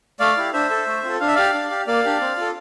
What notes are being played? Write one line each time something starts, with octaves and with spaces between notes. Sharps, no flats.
A3 D5 F5
E4 G4
D4 C5 E5
A4
A3
C4 F4 A4
D4 F5
E5
G4 D5 F5
D4
G4
A#3 D5 F5
D4 G4
C4
F4 A4